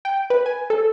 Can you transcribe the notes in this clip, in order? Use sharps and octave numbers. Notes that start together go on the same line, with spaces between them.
G5
B4
G#5
A4